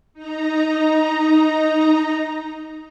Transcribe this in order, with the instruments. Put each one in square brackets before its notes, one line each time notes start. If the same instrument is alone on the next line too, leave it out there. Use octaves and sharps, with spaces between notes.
[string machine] D#4 A#5